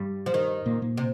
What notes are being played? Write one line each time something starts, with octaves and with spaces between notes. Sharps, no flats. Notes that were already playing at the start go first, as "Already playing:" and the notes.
Already playing: G2 G3
F3
D#3
A#2 A#3
A#2 A#3
C3